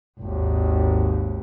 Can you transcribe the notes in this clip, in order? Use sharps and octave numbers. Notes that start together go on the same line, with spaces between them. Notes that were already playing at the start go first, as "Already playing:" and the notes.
G#1 D#2